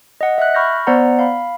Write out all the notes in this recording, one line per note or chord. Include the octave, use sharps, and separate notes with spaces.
D#5 F#5
E5 F#6
B5 C#6 F6 G6 A#6
B3 C5 D5 F#5 A#5
F5 B5